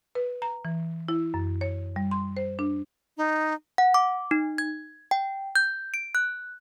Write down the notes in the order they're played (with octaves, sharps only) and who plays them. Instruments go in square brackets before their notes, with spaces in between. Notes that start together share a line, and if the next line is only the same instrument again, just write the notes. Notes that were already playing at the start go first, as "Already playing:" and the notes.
[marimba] B4
A#5
E3
E4
F#2
C#5
G3
C6
C5
D4
[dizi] D#4
[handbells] F#5
D6
D#4
G#6
G5
G6
D7
F#6